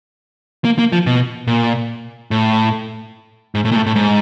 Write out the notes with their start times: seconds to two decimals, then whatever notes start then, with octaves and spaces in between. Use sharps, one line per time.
0.65 A#3
0.79 A#3
0.92 F3
1.06 B2
1.47 A#2
2.31 A2
3.55 G#2
3.65 A2
3.72 A#2
3.76 A2
3.86 A2
3.96 G#2